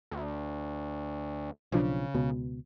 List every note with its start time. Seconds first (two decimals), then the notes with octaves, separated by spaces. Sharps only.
0.11 D2
1.72 B1 C#3 F3 D4
2.14 C#2 B2